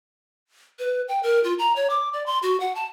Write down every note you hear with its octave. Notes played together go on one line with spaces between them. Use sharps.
B4
G5
A#4
F4
A#5
C#5
D6
D5
C6
F#4
F#5
A5